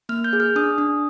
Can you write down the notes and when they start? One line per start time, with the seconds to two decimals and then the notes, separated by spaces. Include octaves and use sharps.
0.09 A#3 F6
0.24 G6
0.33 G#4
0.40 F6
0.56 D4 D#6
0.78 D4